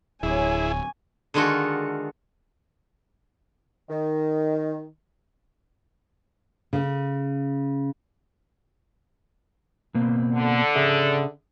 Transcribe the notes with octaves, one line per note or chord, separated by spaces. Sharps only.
D1 E4 G4 G#4 C#5 G5 G#5
D3 D#3 G#3 F4 F#4 A4
D#3
C#3
B2 A#3 C4
D3
C#3 G#4 E5